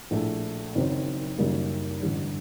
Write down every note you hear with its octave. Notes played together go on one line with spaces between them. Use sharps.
A#1 A2 A3
F#1 F#2 D#3 F#3 C4
F#1 F#2 D#3 G3 A#3
A1 G2 D3